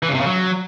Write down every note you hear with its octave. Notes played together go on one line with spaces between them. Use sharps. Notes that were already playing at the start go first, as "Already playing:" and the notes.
E3
C#3
C3
C#3
F#3